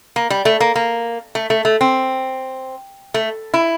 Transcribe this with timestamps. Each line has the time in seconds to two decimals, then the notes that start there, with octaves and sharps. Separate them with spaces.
0.16 A#3
0.30 G3
0.45 A3
0.60 A#3
0.75 A#3
1.35 A3
1.50 A3
1.65 A3
1.81 C4
3.14 A3
3.54 E4